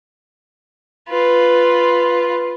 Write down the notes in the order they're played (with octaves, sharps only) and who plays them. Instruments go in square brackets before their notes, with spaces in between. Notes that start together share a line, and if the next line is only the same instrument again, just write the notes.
[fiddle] F4 B4